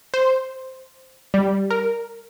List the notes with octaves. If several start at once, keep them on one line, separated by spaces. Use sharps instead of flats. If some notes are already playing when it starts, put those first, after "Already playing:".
C5
G3
A#4